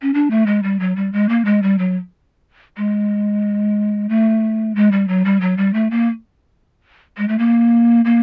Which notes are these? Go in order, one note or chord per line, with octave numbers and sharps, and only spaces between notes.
C#4
D4
A3
G#3
G3
F#3
G3
G#3
A#3
G#3
G3
F#3
G#3
A3
G#3
G3
F#3
G3
F#3
G3
A3
A#3
G#3
A3
A#3
A#3